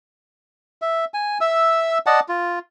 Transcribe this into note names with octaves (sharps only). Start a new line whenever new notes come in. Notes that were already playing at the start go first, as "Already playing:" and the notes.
E5
G#5
E5 E6
D5 D#5 F#5 A5
F4